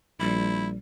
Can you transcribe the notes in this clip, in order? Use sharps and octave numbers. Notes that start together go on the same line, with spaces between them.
A#1 G3 E4